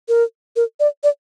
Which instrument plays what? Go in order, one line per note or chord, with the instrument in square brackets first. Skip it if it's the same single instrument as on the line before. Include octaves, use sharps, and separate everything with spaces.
[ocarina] A#4
A#4
D5
D5